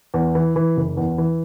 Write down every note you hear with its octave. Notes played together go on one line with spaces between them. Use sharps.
E2
E3
E3
F#1
E2
E3